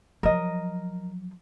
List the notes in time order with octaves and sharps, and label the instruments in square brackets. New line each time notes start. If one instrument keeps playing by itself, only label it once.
[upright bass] F3 F#3 [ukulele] A#4 D#5